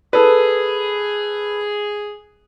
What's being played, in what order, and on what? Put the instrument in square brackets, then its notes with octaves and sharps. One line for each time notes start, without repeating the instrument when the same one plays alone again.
[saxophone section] G#4 [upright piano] A4 B4